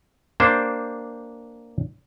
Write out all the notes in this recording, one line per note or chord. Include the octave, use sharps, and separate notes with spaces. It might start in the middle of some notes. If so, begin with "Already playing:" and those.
A#3 D4 G4 C5